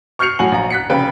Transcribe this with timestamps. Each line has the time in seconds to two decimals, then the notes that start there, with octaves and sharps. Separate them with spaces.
0.19 C#6 F6 G6 C7 C#7 F7
0.39 A2 F#3 F#4 G#5 F#7
0.52 A#1 A#5
0.70 F#6 B6 C#7
0.90 F1 C#3 B4 G5